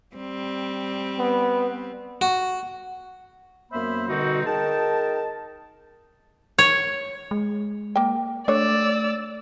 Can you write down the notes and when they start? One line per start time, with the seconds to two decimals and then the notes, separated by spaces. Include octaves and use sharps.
0.16 G3 C4
1.19 B3
2.21 F#4
3.71 F#2 A#3 B3 C5 E5 B5
4.09 B2 D3 G3 C4 D#4 F#4
4.45 D#4 G#4 A#4 G5 A5
6.58 C#5
7.31 G#3
7.96 A#3 G5
8.48 A3 D4 C#5 D5 E6